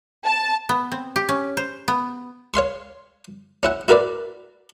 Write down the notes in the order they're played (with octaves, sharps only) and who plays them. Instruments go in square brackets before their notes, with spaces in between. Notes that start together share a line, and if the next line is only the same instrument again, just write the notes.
[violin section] A5
[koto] B3
C4
G4
C#4
C5
B3
[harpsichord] C#5 F5 C6 C#6
C#4 E4 F#5
E4 F#4 A#4 B4 D5